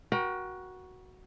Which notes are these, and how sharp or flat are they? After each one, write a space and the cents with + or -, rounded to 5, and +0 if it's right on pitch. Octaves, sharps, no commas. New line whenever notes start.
F#4 +0 A#4 +35 G5 +0